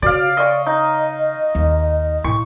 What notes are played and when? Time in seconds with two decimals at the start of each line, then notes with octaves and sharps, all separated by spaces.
0.02 C#3 F#4 D5 F5
0.37 D5 D#5 C#6
0.66 D#4 D#5
1.55 D#2
2.24 A2 E4 C#6